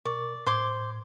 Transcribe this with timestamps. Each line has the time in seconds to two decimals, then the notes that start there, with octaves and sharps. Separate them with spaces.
0.05 B2 A#4 D5 C#6
0.46 A2 C5 C6 D6 G#6